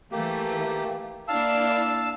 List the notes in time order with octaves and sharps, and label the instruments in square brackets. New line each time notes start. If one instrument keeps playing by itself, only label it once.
[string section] E3 A3 [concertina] A#3 G4
[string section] A#3 D4 E4 [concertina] F5 A5 E6